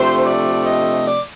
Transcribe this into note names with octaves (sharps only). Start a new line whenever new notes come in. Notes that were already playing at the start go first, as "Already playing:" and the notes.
Already playing: C3 F3 A3 D4 C5
D5
D#5
D5